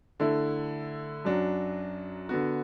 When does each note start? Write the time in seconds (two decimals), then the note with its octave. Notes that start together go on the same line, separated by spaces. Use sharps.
0.20 D3 A3 E4
1.25 F#2 F#3 D4 F#4
2.29 D3 B3 F#4